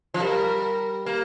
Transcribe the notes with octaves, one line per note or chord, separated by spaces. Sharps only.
F3
G3 A#4
A#3